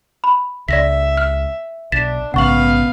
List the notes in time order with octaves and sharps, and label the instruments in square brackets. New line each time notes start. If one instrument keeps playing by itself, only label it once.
[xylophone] B5
[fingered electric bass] C#2 [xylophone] D5 A#6 B6 [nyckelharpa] E5
[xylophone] F6
[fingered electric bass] B1 [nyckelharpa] D4 [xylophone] A6 B6 E7
[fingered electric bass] A#1 G#2 C#3 [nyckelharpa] B3 F5 [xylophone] F#5 C#6 F#7